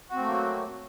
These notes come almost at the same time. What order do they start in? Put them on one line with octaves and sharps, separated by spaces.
F#4 C4 A3 A#3 F#3